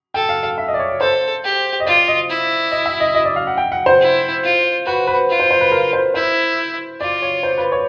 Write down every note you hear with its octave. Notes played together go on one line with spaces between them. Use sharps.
A4 G5
F5
F5
E5
D#5
D5
C#5
D5
A4 C5
G4
D#5
F4 D5
D#5
E4
D#5
E5
D#5
D#5
D5
F5
F#5
G5
F#5
C5
E4
F4
F#4 B4
B4
F4
C5
C5
B4
A#4
C5
E4 C5
F4 D5
C#5
C5
B4
C#5